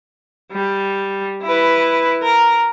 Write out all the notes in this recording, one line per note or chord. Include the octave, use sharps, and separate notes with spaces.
G3
E4 B4
A#4